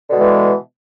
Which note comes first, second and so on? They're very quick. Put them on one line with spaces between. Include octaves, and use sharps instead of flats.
D3 B2 G#3 E3